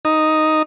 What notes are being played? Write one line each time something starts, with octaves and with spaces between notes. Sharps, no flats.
D#4